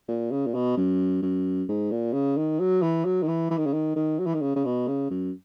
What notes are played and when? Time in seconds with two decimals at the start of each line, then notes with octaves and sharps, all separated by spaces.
0.08 A#2
0.31 C#3
0.47 A#2
0.54 B2
0.77 F#2
1.23 F#2
1.69 G#2
1.92 A#2
2.14 C#3
2.37 D#3
2.60 F#3
2.82 E3
3.05 F#3
3.23 D#3
3.28 E3
3.51 E3
3.58 D#3
3.66 C#3
3.73 D#3
3.96 D#3
4.19 F#3
4.26 E3
4.34 D#3
4.41 C#3
4.56 C#3
4.65 B2
4.87 C#3
5.10 F#2